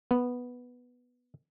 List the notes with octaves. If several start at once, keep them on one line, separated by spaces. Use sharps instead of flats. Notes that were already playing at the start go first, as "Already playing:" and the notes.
B3